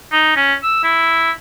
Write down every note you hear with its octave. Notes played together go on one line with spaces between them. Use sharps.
D#4
C#4
E6
E4